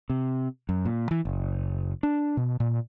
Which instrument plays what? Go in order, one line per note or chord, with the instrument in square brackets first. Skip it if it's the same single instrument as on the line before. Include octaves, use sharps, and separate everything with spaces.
[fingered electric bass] C3
F#2
A#2
E3
F#1
D4
B2
A#2